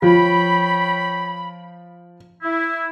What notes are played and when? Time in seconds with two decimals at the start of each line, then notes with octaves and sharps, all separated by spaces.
0.02 F3 C#5 G5 B5
2.42 E4